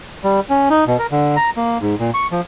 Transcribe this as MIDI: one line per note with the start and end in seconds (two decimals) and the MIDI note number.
0.24 0.40 55
0.50 0.69 61
0.70 0.84 63
0.87 0.97 47
0.99 1.07 70
1.11 1.36 50
1.36 1.50 82
1.57 1.78 58
1.81 1.95 44
1.99 2.11 46
2.14 2.27 85
2.32 2.41 53